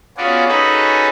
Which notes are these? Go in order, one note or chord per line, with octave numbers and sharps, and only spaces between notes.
B3 C#4 F4 F#4 G#4 D5
C#4 D#4 F#4 G#4 A4 B4